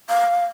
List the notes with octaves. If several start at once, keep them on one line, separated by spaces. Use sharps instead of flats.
F5